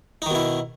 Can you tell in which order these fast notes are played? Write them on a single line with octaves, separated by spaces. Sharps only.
D#4 D#3 B2 E4